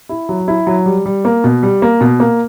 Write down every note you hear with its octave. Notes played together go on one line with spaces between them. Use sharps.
E4
F#3
E4
F#3
G3
G3
A#3
B2
G3
A#3
B2
A#3